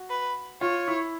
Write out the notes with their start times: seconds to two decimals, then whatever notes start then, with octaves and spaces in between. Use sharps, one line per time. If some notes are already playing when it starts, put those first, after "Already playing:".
Already playing: F#4
0.10 B4
0.61 F4 C#5
0.88 E4